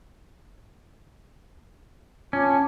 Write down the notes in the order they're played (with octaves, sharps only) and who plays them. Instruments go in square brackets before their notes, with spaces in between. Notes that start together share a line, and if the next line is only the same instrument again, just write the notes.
[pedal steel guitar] C#4 [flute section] F4 A5 D6